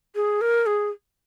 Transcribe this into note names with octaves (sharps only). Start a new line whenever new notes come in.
G#4
A#4
G#4